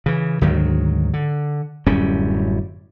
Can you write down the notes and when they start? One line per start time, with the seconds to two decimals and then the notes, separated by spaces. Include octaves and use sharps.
0.06 C#3 E3
0.41 D2 G#2 D#3 F#3
1.14 D3
1.86 D1 F#2 G3 C#4